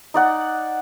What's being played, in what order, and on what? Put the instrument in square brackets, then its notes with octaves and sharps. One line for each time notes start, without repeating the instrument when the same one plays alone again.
[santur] D#4 D5 F#5